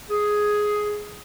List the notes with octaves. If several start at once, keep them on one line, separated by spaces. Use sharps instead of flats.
G#4